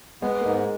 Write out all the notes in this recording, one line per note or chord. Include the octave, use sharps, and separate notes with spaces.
G#3 B3
A#3
G#2 G#3